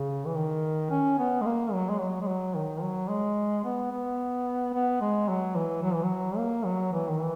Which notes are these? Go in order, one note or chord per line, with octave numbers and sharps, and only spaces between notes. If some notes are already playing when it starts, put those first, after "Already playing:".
Already playing: C#3
E3
D#3
C#4
B3
G#3
A#3
F#3
G#3
F#3
G#3
F#3
D#3
F#3
G#3
B3
B3
B3
G#3
F#3
E3
F#3
E3
F#3
A#3
F#3
E3
D#3
E3